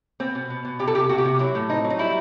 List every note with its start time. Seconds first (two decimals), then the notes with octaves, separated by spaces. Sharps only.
0.20 B3 C4
0.35 B2
0.50 B2
0.65 B2
0.79 C3 G4
0.88 A4
0.94 C3 G4
1.09 C3 F#4
1.18 G4
1.25 C3 F#4
1.39 F#3 E4
1.55 A2
1.69 C4 D#4
1.84 F#3
1.90 D#4
1.99 G3 E4